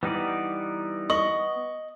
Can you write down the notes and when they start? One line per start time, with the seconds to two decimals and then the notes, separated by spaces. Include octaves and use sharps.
0.03 E3 G3 B3 D#4 D5
1.10 D#5 C#6 F#7